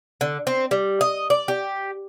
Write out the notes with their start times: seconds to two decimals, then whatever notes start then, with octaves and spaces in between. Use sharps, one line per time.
0.21 D3
0.47 C4
0.71 G3
1.01 D#5
1.30 D5
1.48 G4